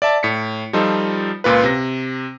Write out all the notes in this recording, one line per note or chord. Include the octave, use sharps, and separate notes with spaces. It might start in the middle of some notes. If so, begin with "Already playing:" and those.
D5 E5 A5
A2 B6 C#7
F3 G3 D#4 F4 A4
C#2 A#2 F4 B4
C3 A#6